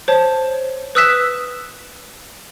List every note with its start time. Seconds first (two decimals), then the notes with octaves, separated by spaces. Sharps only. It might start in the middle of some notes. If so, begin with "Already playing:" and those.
0.08 C5 C#5 A5
0.95 B4 D#6 E6 F#6 B6 E7